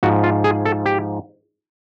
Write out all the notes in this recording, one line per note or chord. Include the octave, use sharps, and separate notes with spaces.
G#2 F3 F#4
F4
G#4
A4
G4